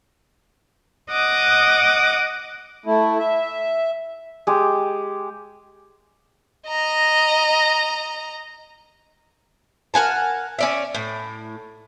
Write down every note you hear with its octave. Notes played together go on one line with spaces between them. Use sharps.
D#5 F#5 D6 D#6
A3 E4
E5
G#3 G4
D#5 A#5
A#4 F#5 G#5 A5
C#4 D5 E5
A2